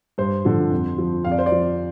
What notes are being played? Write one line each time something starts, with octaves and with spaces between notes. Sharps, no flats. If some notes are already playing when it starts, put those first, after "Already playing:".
G2 C5
D3 F3
F2
F3
F2 F5
D5
C5
D5
F3